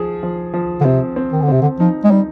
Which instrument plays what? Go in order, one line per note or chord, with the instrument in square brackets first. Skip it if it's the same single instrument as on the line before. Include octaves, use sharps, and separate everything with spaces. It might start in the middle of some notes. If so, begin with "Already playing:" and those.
Already playing: [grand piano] F3 G#4
F3
F3
[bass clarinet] D3
[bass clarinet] C3 [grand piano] C4
[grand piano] C4
[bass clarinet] D#3
D3
[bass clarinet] C3 [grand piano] C4
[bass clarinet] D3
[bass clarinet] F3 [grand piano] D#4
[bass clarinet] G#3
[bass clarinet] G3 [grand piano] D#4